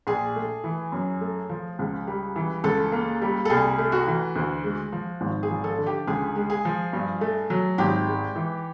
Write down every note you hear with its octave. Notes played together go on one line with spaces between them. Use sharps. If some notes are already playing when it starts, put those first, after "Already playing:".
A#1 G#4
A3
E3
F#2
A3
F3
C#2
G3
E3
C#2 A4
A#3
G3
A4
C2 G#4
A3
F#4
E3
D2
G#3
F3
G#1
G#4
F3
A4
D3
G4
C#2 G#4
G#3
G#4
F3
G2
A3
F#3
G#1 G4
G#3
E3